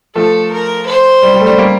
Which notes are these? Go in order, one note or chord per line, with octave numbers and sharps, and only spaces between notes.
F3 A3 A4
A#4
C5
G3
G3
A3
G3
G3 A#3